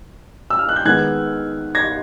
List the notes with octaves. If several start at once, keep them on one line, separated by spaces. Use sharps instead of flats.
E6
F6
F#6
G6
D#3 G#3 B3 F#6 G#6
G#6 A#6